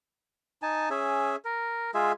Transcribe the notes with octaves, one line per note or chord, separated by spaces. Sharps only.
D#4 G#5 A5
C#4 G#4 E5
A#4
G#3 F4 G#4 E5